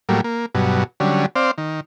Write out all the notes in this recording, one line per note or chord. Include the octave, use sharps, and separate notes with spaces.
A2 F#3 G3 A#3
A#3
G2 B2 F#3
D3 F#3 G3 C#4
C4 C5 D5 F5
D#3